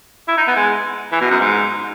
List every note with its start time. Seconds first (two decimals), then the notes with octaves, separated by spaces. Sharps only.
0.28 E4
0.37 D#4
0.47 B3
0.56 G#3
1.12 E3
1.21 B2
1.30 F#2
1.40 G#2